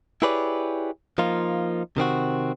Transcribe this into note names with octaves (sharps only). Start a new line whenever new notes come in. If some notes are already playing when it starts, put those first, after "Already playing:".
E4 G4 G#4 B4 C#5 D5
F3 A#3 D#4 F4
C3 D#3 C4 F#4